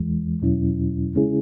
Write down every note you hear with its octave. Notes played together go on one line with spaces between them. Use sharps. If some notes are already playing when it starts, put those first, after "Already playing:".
Already playing: E2 E3 G#3
E2 B2 F#3 C#4 E4
C#3 G#3 C#4 E4 G#4